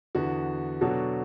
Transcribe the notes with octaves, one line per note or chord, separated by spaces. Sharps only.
E2 D3 B3 F#4
B2 F#3 D4 F#4 A4